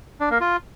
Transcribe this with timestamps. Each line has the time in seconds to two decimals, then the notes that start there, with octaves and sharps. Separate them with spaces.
0.20 D4
0.31 A#3
0.41 F4